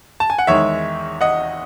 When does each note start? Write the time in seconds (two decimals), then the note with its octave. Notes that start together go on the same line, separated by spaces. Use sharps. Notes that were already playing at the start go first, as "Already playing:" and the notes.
0.20 A5
0.30 G#5
0.38 F#5
0.47 E2 D#3 G#3 C#5 E5
1.21 D#5 F#5